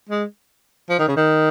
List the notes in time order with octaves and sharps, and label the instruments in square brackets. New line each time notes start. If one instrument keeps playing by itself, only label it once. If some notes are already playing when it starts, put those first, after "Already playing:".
[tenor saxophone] G#3
F3
D#3
C#3
D#3